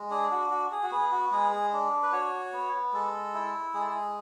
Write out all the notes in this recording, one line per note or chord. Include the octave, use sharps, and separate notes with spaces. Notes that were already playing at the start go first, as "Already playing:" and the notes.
Already playing: G#3
D4 G#4
F#4
F#4
G#4
F#4
B3 G#4
F#4
G#3 G#4
G#4
D4
B4
F#4 C#5
B3
G#3 A4
E4
G#3 G#4
A4
G#4